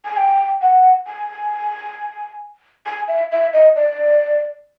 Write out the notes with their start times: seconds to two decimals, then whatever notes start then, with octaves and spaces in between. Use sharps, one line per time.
0.05 G#5
0.17 G5
0.62 F#5
1.07 G#5
2.86 G#5
3.08 E5
3.32 E5
3.53 D#5
3.76 D5